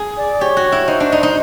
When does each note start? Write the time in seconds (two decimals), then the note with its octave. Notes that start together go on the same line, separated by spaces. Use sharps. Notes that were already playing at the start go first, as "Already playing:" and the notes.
Already playing: G#4
0.17 D5
0.41 G4 C#5
0.57 F#4
0.72 E4
0.88 D#4 C5
1.00 D4
1.12 D#4
1.23 D#4